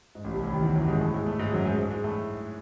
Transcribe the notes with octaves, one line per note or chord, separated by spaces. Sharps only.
G#2
A1 A2
C2 C3
A1 A2
D#2 D#3
E2 E3
F#2 F#3
G#2 G#3
A2 A3
G#2 G#3
A2 A3
G#2 G#3
F#2 F#3
G#2 G#3
G#2 G#3
G#2 G#3
A2 A3